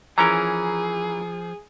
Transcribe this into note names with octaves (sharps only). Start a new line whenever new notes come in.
E3 F3 C#4 G#4 A#4 A#5